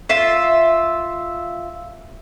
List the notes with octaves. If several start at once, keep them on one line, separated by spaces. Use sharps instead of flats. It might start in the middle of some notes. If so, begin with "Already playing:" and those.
F4 E5